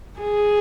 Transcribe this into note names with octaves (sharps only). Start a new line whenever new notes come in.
G#4